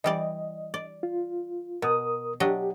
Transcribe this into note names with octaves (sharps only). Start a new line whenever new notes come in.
E3 G3 D5 D#5
D5
F4
B2 A#4 D#6
F#3 D4 G4 D#5